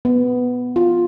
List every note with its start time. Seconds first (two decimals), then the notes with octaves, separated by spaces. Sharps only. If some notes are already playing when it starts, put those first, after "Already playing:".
0.05 B3
0.76 F4